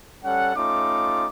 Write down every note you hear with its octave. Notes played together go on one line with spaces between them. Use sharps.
G3 C#4 A4 F#5
A3 C#4 D#4 F4 D6